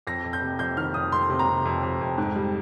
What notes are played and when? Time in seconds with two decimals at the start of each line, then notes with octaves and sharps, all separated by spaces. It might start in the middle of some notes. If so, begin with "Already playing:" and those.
0.07 F2 A#6
0.24 F2
0.33 G6
0.42 C3
0.59 F2 G6
0.77 D#3 F6
0.94 F2 D#6
1.12 F2 C6
1.30 C3
1.39 A#5
1.47 C3
1.65 F2
1.83 F2
2.01 F2
2.18 G#2
2.36 G3